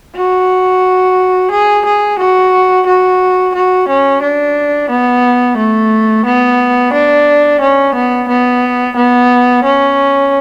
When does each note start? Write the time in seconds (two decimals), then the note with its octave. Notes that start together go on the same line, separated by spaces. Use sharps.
0.16 F#4
1.51 G#4
1.86 G#4
2.19 F#4
2.86 F#4
3.55 F#4
3.88 C#4
4.22 D4
4.90 B3
5.57 A3
6.25 B3
6.93 D4
7.61 C#4
7.95 B3
8.29 B3
8.96 B3
9.64 C#4